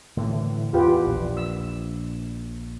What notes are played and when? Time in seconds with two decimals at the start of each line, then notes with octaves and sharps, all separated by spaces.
0.17 A2 D3 E3
0.73 E2 F4 G4 B4
1.06 A#1
1.37 E6